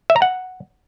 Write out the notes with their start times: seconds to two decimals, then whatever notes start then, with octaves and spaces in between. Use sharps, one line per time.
0.10 E5
0.16 A#5
0.22 F#5